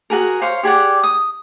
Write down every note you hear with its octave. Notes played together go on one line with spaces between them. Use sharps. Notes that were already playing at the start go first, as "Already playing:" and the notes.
F#4 G#4 A#4
C5 C#5 F5 C6
G4 G#4 D5 F#5
D#6